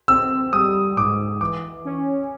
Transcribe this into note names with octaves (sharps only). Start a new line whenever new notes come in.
C4 E6
G3 D#6
G#2 D6
E3 D6
C#4